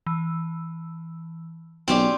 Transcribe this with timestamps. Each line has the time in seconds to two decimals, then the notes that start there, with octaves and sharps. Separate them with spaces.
0.06 E3
1.88 B1 C4 C#4 G4 D5 G5